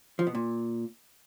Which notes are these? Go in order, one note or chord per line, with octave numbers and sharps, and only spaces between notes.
F3
B2
A#2